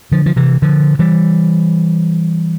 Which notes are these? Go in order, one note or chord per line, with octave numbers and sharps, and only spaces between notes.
D3 F3
F3
C3 E3
D3 F3
E3 G3